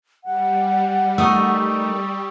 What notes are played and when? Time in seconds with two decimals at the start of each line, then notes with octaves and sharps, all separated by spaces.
0.24 G3 F#5
1.18 A3 D#4 A#4 C#6 D#6 E6